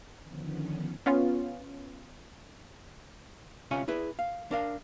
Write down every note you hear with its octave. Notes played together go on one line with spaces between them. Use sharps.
D3 D#3 F3 B3 C#4
B3 C#4 F4
C2 C3 C#4 F4 C#5 G#5
E4 G#4 B4
F5
D4 A#4 F5